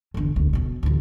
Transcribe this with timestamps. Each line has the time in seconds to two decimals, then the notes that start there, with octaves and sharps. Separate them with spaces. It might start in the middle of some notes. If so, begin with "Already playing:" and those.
0.14 G1 E2
0.36 E1 D2
0.53 F2 B2
0.83 A1 D2